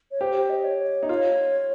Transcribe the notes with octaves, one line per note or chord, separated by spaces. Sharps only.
C#5
G4 C5
C5
D#5
C#5
D#4
F4 C#5